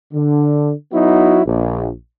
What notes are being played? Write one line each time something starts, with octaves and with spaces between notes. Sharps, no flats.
D3
F#3 B3 D#4 E4 F#4
A#1